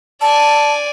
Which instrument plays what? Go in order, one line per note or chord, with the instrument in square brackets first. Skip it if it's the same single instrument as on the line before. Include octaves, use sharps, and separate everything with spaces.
[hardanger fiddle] D5 G#5 [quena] A5